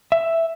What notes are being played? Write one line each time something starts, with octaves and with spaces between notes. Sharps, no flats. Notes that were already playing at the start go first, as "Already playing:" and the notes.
E5